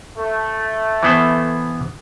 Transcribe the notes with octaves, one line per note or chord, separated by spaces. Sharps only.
A3
E3 B3 C5